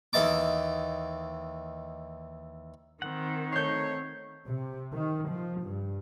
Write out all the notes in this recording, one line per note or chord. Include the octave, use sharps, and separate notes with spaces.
D#2 E3 D#5 A5 D6
D#3 C4 F#5
A3 D#4 C#5 G6 C7
C3
D#3
F3
G2